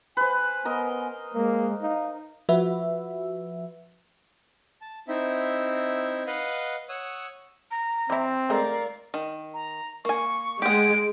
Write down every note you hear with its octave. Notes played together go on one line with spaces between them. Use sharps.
B4 C5 G#5
B3 A#4 D#5
G#3 A#3
D#4 F5
F3 F#4 B4 E5
A5
C4 D#4 E4 E5
B4 D#5 F5 F#5
C#5 F#5 D#6 E6
A#5
E3 C4 E4
G#3 A3 A#4 D5 F5
D#3
A#5
A#3 G#5 C#6
G#3 G4 F#5 D7